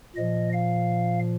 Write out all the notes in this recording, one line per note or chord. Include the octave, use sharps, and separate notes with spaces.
A#2 F3 D#5
F5